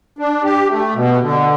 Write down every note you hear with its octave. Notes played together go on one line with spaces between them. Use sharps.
D4
G4
A3
B2
D3